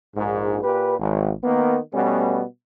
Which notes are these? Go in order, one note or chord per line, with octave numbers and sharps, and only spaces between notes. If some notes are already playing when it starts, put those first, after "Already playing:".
A#1 G#2
A#2 G4 B4
G#1
D#3 A#3 B3
B2 G3 A3 B3 C#4